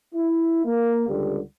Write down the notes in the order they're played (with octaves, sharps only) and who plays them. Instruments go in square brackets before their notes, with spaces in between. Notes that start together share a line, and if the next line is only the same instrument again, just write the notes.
[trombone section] E4
A#3
C#2 D3 G3